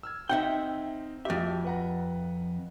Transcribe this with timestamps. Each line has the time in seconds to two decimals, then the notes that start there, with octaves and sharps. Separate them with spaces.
0.03 E6 F6 G#6
0.29 C4 D#4 E5 F#5 G5
1.25 F2 F#4 G4 E5
1.65 B4 F#5 A#5